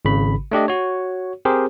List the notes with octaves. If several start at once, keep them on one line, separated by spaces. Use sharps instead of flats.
G#1 C#3 B5
A3 D4 G4 D#5
F#4 C#5
C4 G4 G#4 A#4 C5